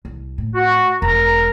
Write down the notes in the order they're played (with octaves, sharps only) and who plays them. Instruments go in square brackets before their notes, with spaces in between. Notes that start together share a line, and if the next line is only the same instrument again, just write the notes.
[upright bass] C2
A2
[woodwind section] F#4
[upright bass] E1 [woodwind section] A#4 A#5